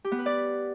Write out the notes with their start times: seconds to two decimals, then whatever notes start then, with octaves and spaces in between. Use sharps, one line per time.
0.04 G4
0.12 B3
0.19 B4
0.26 D5